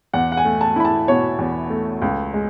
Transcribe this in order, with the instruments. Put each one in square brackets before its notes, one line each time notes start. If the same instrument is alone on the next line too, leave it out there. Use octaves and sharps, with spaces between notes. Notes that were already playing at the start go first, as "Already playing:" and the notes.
[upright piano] E2 F#5
F#5
G#5
A3
A5
E4 B5
A5
B2 C#5
E2
A3
C#2
G#3